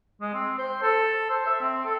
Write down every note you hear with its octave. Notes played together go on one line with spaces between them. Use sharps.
G#3
C4
C5
A4
C5
E5
C4
A4